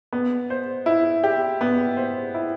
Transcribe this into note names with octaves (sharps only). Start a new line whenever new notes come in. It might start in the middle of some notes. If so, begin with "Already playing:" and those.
B3
C5
E4
G4
B3
C5
E4